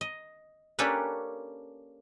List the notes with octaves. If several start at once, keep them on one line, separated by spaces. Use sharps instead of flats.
D#5
A#3 C#4 D4 G4 A4 B4